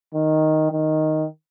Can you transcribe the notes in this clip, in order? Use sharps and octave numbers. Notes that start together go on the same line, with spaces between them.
D#3
D#3